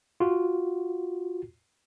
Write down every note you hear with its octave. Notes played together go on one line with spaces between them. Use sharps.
F4 F#4